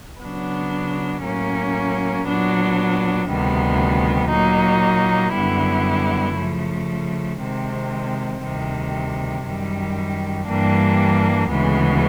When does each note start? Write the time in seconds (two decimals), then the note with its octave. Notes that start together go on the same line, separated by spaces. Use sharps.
0.21 C#3 F#3 B3 D4
1.23 A2 F#3 A#3 C#4
2.26 A#2 F#3 B3 D4
3.29 D2 C3 D#3 G3 B3
4.31 A#2 F#3 A#3 D#4
5.34 F#2 D3 G3 B3 E4
6.36 C#3 F3 A3
7.39 C3 D#3 G#3 C4
8.42 D2 C3 D#3 G3
9.45 F#2 D#3 G3
10.47 G2 E3 G3 A#3 D4
11.50 D2 C#3 E3 G#3 B3